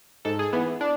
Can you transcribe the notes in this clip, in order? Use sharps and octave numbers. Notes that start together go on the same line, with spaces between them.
G#2 A4
G#4
E3 B3
D4